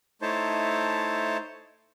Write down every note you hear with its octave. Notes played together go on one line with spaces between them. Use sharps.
A3 D#4 E4 C5 C#5 A5